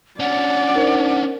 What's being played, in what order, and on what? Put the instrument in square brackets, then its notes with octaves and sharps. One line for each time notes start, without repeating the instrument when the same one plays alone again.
[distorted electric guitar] C#4 D4 [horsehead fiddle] D5 [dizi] F#5
[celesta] D#4 A#4 C5